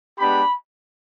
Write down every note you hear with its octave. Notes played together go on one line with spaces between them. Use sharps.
G#3 B3 D4 G4 B5